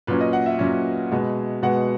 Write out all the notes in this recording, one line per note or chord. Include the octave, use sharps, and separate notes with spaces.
A#2 F#3 C#4 B4
D#5
F#5
E5
A#2 F#3 C#4
B2 G#3 B3
B2 G#3 B3 F#5